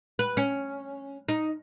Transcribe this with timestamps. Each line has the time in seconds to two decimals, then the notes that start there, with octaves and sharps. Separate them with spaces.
0.19 B4
0.37 C#4
1.29 D#4